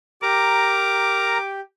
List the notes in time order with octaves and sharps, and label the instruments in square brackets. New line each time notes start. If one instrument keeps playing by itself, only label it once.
[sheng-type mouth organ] G4 [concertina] A#4 A#5 [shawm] D6